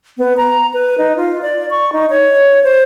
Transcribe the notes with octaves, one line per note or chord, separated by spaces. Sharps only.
B3
A#5
B4
D#4
F4
D5
C#6
D#4
C#5
C5